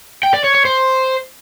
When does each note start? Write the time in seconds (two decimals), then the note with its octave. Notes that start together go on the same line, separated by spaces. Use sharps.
0.23 G5
0.34 D5
0.44 C#5
0.55 C#5
0.65 C5